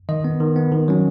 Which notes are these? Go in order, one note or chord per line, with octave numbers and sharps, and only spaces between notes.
D#3 D#5
B3
D#3
B3
D#3
F#3 C#4